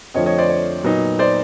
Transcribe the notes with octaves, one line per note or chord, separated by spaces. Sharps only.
F2 D3 F3 A3 C#5 D#5
C#5 D#5
C5 D5
C#5
A#2 F#3 B3 D#4
C5 D5